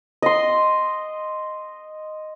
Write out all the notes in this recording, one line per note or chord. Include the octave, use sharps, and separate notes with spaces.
D#5 C6